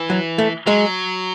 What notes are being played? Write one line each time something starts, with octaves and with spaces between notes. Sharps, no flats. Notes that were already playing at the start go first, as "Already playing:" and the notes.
Already playing: E3
F#3
A3
F#3 G#3